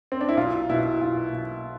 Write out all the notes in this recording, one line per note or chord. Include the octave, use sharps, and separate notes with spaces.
C4
D4
E4
B1 F4
B2 E4
B1 F4
B1